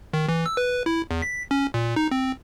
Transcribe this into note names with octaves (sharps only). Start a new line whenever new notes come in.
D#3
E3
E6
B4
E4
E2
B6
C#4
A#2
D#4
C4